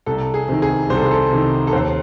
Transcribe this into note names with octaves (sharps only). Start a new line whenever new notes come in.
C2 A4
G#4
C3 D#3
G#4
C2 C5
A4
G#4
A4
C3 D#3
A4
D#2 C5